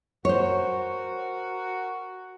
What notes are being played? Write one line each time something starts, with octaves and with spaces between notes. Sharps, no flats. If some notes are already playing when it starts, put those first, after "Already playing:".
F#4 A#4 C5 C#5